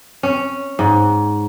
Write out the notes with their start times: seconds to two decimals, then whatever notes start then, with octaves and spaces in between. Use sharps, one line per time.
0.23 C#4
0.79 G#2